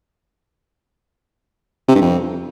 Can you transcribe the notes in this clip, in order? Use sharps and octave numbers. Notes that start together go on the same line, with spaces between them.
C3
G2
F2